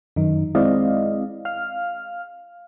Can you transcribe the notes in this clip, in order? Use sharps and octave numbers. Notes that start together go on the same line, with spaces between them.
F#2 D#3 D#4
G#3 C4 E4 D5 D#5 F5
F5 F6